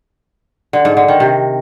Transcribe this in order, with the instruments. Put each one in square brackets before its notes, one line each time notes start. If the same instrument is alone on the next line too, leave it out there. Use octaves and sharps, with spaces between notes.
[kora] D3
G#2
D3
D#3
C3